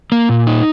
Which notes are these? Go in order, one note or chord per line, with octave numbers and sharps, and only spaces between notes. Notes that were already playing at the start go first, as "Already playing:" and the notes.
A#3
A#2
D#4